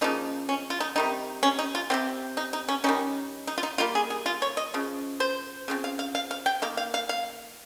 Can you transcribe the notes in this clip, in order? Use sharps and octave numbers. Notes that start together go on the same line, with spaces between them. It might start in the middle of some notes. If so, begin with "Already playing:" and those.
C#3 F3 A#3 D#4
C#4
F4
D#4
C3 D#3 G3 D#4
C#4
D#4
F4
C3 F3 C4 G4
D#4
D#4
C#4
D#3 G3 C#4 D#4
D#4
F4
D#4
D#3 G3 A#3 F4
G#4
G#4
F4
C#5
D#5
C#3 F3
C5
C#3 F3 C4
F5
F5
F5
F5
G5
D#3 A#3 F5
F5
F5
F5